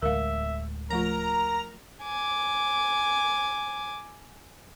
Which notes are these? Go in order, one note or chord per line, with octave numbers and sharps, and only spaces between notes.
D1 D2 G#3 A#4 E5 F5
F3 A3 F4 A#4 A#5
G#5 D6